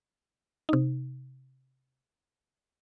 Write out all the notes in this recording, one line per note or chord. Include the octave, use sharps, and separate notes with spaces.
C3 D#4